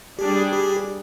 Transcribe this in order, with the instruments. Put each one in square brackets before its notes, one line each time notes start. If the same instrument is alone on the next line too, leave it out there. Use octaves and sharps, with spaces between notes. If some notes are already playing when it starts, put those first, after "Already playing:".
[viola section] G3 D4 G#4 [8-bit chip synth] G4
[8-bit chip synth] G4